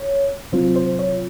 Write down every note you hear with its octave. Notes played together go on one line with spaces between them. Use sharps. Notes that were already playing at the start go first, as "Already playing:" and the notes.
Already playing: C#5
C3 F#3 C4 F4 C5
C5
C#5